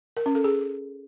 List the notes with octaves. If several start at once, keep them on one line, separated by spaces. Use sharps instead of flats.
A#4
C#4
A4
G#4